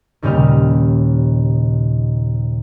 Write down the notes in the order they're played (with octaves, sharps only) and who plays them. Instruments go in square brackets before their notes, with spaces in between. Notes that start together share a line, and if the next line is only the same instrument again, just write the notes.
[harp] D#2 A#2 C#3 G3 D#4 F6